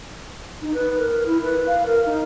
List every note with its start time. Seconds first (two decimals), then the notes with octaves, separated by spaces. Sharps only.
0.62 D#4
0.74 B4
0.98 A#4
1.26 E4
1.44 B4
1.67 F5
1.86 A#4
2.06 D#4